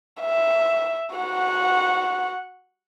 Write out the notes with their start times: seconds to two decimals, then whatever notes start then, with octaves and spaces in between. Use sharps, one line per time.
0.21 E5
1.15 F#4 F#5